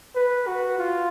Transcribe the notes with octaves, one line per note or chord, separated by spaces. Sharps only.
B4
F#4
F4